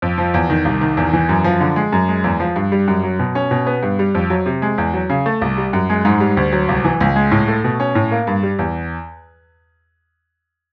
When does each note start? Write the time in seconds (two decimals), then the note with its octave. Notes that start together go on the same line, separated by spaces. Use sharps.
0.02 F2
0.18 F3
0.34 E2
0.50 D#3
0.65 C2
0.81 D#3
0.97 E2
1.13 E3
1.29 F#2
1.44 F3
1.61 D3
1.76 G#3
1.92 F#2
2.08 G#3
2.24 E2
2.40 F3
2.56 G2
2.72 G3
2.88 F#2
3.04 F#3
3.19 B2
3.35 C#4
3.51 B2
3.67 B3
3.83 G2
3.99 G3
4.15 F2
4.30 F#3
4.46 C3
4.62 G#3
4.78 E2
4.94 F#3
5.10 C#3
5.26 A3
5.41 C2
5.57 G3
5.73 F#2
5.90 G#3
6.05 G#2
6.20 G3
6.37 D2
6.52 F#3
6.69 C2
6.85 E3
7.01 C#2
7.16 G#3
7.31 A2
7.48 A3
7.64 B2
7.80 C#4
7.95 A2
8.11 A#3
8.27 G2
8.43 G3
8.59 E2